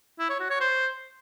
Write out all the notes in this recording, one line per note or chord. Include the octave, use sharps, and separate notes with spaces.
E4
C#5
F#4
C#5
C5